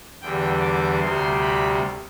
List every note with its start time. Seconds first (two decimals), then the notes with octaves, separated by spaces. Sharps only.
0.21 E2 D3 G3 G5
0.61 D6
1.00 D2 C3 G3 C6
1.41 B5